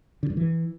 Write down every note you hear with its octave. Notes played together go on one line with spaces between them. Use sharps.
D3
G2
E3